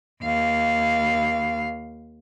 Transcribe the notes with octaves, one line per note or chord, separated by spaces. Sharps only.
D#2 F5